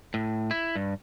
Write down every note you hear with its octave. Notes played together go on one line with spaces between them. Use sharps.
A2
E4
G2